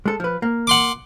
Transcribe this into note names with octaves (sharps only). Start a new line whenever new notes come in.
G#3 A4
F3 B4
A#3
F#5 C6 D6